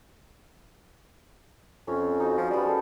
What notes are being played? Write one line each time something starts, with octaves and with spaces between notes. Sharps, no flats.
F2 C#4
D#4 F#4
F3
G3 B3 G5
G#3 A4